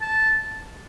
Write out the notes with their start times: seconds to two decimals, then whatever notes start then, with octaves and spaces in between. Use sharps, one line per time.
0.01 A5